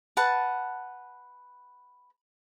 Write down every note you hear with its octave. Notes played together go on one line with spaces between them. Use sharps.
B4 F#5 A5